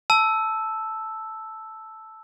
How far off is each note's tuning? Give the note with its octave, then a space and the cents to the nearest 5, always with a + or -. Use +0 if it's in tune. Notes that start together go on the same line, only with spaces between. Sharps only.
A5 +0 E6 +0